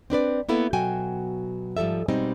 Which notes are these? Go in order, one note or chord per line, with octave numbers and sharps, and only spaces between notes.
C4 D4 B4 D5
A#3 B3 E4 A4 B4
B2 F#3 F#4 G5 G#5
G#2 F3 G3 A4 E5
B2 G3 G#3 C4 D#4